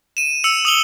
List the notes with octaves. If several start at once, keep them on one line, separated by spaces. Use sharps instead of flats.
D#7 E7
E6 C#7 F7
D#6 F#7 G7